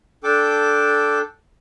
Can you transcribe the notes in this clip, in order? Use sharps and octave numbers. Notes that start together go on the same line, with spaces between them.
D4 A4 G5 D6